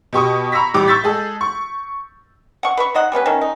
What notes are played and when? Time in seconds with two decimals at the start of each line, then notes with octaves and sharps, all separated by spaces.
0.13 B2 G4 C#6 D#6
0.52 A#5 B5 C#6 E6 A#6 B6
0.74 A1 G3 G4 D6
0.88 C#6 E6 G6 A6 B6
1.04 G#3 G#4 A4
1.41 C#6
2.63 F#5 C#6
2.77 B4 B5 C#6
2.94 D#4 C5 D#5 F#5
3.12 G3 B3 C#4 B4
3.26 D#3 A3 C#4
3.41 D#4